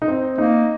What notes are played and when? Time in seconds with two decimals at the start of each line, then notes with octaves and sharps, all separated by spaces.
0.02 D#4
0.08 C4
0.38 A#3 D#4